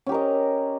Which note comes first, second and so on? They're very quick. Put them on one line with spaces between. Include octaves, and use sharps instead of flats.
C#4 G4 A#4 D#5